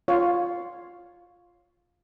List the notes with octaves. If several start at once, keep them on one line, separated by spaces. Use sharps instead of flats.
F4 C#5